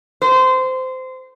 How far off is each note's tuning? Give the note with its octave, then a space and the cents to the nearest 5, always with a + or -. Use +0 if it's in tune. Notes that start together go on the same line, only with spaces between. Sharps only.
C5 -20